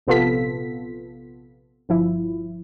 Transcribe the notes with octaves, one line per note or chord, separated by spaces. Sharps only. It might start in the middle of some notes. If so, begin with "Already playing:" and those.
A#1 C3 B3 F4 A4 B6
G1 F3 E4